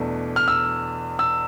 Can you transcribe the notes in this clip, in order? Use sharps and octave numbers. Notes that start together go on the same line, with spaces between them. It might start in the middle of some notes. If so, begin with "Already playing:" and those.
Already playing: E2 B2 A3 D4
F6
E6
E6